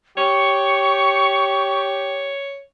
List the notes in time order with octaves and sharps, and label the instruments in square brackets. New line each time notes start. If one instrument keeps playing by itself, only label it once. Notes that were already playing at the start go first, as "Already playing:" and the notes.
[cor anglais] G4 [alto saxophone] C#5 [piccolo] C#6